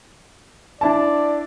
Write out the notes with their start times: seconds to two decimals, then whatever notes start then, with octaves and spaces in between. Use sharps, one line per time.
0.81 D4 E4 D5 A5